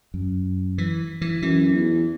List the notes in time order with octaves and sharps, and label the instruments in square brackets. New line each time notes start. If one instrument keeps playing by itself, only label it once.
[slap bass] F#2
E3
E3
[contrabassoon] F#2 [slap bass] E3
[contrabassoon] E2